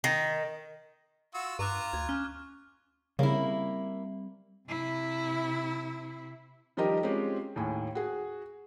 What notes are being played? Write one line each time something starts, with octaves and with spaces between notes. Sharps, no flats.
D#3
F4 F#4 E6
G2 F4 A#5 C#6 D6 F#6
D2 G#6
C#4 F6
C#3 G3 A#3 C4 E4
C3 E4
D#3 F3 G3 G4 A#4 D#5
G#3 C4 C#4 F4 G4
D#2 A2 G#5
F#4 G#4